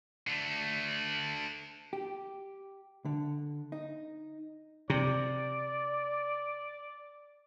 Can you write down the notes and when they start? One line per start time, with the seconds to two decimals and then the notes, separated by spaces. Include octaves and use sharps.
0.27 D3 A3
1.93 G4
3.05 D3
3.72 D#4
4.90 C3 D5